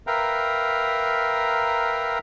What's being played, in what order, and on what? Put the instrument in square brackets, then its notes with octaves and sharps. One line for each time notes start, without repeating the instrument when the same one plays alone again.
[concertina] A#4 B4 E5 F5 G5 A#5